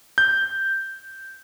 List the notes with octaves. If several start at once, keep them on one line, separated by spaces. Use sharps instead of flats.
G6